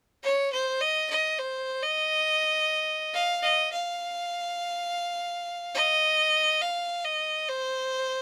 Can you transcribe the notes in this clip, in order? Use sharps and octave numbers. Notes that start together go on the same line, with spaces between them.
C#5
C5
D#5
D#5
C5
D#5
F5
D#5
F5
D#5
F5
D#5
C5